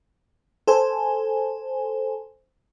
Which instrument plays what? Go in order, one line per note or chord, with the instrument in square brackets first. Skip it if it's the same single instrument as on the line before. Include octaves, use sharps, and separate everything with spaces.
[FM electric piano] A4 C5 G#5